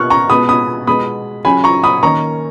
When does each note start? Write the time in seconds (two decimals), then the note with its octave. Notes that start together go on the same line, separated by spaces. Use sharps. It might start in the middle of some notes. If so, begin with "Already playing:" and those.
Already playing: B2 A#3 C#4 C#6 F6 F#6
0.10 A#5 C#6
0.30 B2 G#3 B3 B5 D#6
0.49 B5 D#6
0.87 B2 G#3 B3 B5 D#6
1.45 C#3 F#3 C#4 G#5 B5
1.64 A#5 C#6
1.84 B5 D#6
2.03 D#3 A#3 C#4 A#5 C#6